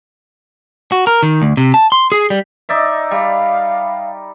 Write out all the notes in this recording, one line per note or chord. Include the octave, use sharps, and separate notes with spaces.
F#4
A#4
D#3
D2
C3
A5
C6
G#4
G3
D#4 D5 E5
G3 F5